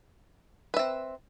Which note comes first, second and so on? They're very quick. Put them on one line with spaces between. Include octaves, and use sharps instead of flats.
B4 E5 C4